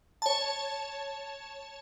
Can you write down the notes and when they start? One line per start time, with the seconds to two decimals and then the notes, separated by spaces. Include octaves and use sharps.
0.22 C#5 A5